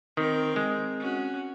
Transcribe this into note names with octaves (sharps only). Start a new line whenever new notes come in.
D#3 C4 A#4
G#3
C#4 F#4